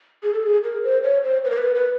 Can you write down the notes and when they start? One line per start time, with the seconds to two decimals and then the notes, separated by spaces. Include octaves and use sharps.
0.23 G#4
0.33 A4
0.43 G#4
0.64 A#4
0.84 C5
1.04 C#5
1.24 C5
1.45 B4
1.51 A#4
1.58 B4
1.75 B4